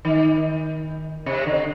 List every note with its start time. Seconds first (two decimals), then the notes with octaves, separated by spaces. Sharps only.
0.05 D#3
1.26 C3
1.46 D3